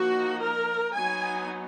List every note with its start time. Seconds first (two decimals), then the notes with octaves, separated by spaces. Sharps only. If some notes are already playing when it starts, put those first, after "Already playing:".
Already playing: F3 A#3 D#4 F#4
0.42 A#4
0.94 F#3 B3 D#4 G#5